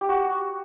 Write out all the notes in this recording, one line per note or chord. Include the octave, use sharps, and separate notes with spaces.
G4
F#4